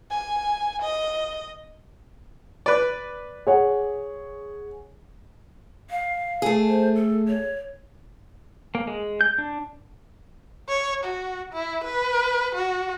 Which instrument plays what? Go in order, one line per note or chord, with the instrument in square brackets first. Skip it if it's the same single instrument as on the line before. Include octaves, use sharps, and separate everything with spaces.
[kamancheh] G#5
D#5
[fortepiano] B4 D5
[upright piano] G#4 C#5 F#5
[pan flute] F5
[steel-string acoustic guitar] A3 G#4
[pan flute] C5
A4
C#5
[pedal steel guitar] A#3
G#3
G6
D4
[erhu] C#5
F#4
E4
B4
F#4